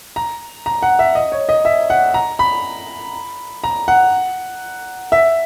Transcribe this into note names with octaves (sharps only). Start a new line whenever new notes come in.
A#5
A#5
F#5
E5
D#5
C#5
D#5
E5
F#5
A#5
B5
A#5
F#5
E5